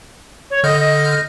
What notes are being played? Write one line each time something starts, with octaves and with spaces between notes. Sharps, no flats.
C#5
D3 D#5 F6 G6
D#5